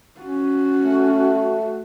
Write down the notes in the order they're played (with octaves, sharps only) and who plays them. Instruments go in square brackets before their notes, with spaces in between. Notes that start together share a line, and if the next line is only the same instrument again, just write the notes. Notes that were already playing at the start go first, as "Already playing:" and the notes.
[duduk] C#4 [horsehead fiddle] F#4
[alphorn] A3